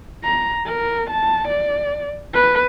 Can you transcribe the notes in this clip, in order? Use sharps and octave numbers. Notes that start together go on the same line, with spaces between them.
A#5
A#4
A5
D5
B4